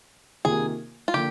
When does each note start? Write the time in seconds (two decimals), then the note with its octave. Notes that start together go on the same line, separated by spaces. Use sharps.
0.45 C3 D#3 A#3 F4 G#4
1.08 F4
1.14 D3 F3 A#3 G4